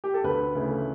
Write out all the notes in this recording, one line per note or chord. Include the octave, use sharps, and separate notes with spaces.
G4
A4
D2 B4
C#3 E3 A3 E4